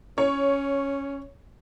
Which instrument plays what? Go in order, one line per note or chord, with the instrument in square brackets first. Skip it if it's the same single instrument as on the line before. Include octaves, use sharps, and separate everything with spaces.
[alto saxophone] C#4 [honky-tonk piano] C#5